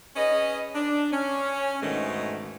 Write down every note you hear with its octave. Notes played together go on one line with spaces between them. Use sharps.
C#4 G#4 B4 D#5
D4
C#4
G#2 B2 D3 D#3 G#3 A3